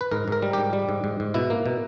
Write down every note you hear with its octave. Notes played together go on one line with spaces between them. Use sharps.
B4
G#2 A#4
G#2 A#4
G3
G#2 G4
G3
G#2
G#2
G#2
B2 E4
A#3
B2